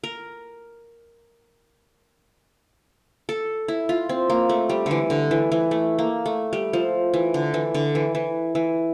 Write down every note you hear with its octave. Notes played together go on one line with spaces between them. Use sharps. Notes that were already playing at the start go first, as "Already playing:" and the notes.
A#4
A4
E4
F4
C4
A#3
A3
G3
D3 E3
D3
E3
E3
A3
A#3
A3
G3
F3
E3
D3
E3
D3
E3
E3
E3